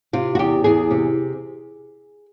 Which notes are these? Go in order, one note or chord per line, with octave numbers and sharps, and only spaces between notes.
C3 F4
F#4
E2 G4
E2 G#4
C3